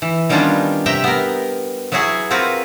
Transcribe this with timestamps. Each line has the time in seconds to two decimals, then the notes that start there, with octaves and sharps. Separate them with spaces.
0.02 E3
0.29 D#3 G3 B3 C#4 D4 F4
0.86 C3 G4 E5 G5 A#5
1.04 B3 A#4
1.92 F#3 B3 E4 F#4 G#4
2.31 C4 F4 F#4 A#4 B4